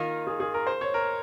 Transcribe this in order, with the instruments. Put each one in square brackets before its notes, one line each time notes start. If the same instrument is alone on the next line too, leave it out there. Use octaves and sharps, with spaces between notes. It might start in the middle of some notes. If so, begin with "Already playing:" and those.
Already playing: [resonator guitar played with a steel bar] D#3 A#3 D#4 [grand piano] F4
[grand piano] G#4
G#4
A#4
C5
C#5
A#4